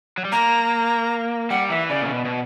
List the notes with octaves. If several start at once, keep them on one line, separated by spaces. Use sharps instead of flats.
F#3
G3
A#3 A#5
G3 F#5
E3 E5
C#3 D5
A#2
B2
B2